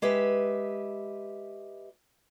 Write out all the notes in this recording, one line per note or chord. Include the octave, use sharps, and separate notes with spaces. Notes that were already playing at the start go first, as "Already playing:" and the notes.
G#3 G4 B4 E5